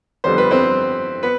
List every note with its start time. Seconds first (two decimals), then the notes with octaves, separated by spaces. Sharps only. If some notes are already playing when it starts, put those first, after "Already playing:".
0.24 F2 D3 G3 B3 C5
0.38 B4
0.51 C4 C5
1.23 B3 B4